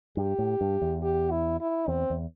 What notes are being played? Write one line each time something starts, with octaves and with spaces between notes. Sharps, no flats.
G2 G4
A2
G2
E2
G4
E4
E4
E2 C4
E2